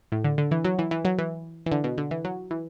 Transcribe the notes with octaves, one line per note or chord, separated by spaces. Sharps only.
A2
D3
D3
E3
F#3
E3
E3
F#3
E3
E3
D3
B2
D3
E3
F#3
E3